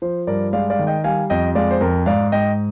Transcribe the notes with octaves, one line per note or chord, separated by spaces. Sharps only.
F3 C5
G2 A#4 D5
G#3 D5 F5
D5 F5
D#3
D#5 G5
G3 F5 G#5
F2 D#5 G5
G#3 D5 F5
C5
F2 A#4
G#2 D5 F5
G#2 D#5 G5